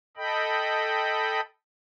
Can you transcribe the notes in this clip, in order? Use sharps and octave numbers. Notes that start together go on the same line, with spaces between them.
A4 D#5 G5 B5